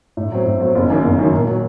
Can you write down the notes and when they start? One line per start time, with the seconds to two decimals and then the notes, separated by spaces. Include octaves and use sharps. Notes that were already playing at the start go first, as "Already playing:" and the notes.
0.17 A2
0.32 F#3 C4
0.46 A2
0.61 F#3 C4
0.75 F#1
0.89 F#2 D#3 F#3 A#3
1.04 F#1
1.19 F#2 D#3 F#3 A#3
1.33 A#2
1.47 F#3 A#3